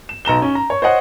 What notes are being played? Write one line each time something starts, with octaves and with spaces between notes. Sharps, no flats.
E7
B1 A#5 E7 G7
C#4
A#5
C#5
C5 C#5 D#5 F#5